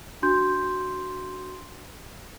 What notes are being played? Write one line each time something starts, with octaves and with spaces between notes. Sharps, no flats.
D4 F#4 C6 G6